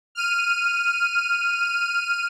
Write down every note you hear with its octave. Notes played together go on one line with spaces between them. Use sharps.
F6 D#7